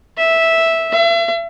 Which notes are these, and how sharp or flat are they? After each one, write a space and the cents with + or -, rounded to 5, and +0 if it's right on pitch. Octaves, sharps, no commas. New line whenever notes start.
E5 -5
E5 +40